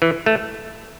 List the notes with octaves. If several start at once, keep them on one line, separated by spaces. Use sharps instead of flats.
E3
A3